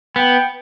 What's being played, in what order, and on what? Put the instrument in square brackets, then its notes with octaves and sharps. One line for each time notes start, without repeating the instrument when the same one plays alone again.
[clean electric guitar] B3 [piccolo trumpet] G5